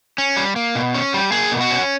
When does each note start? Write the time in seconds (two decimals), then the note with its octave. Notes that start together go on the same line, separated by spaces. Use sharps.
0.18 C#4
0.37 G3
0.56 A#3
0.75 B2
0.94 C#4
1.14 G3
1.32 A#3 G#4
1.52 B2
1.61 F#4
1.70 C#4